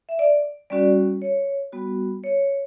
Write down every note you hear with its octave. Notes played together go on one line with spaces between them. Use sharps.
E5
D5
G3 C#4 F#4 D5
C#5
G3 B3 F#4
C#5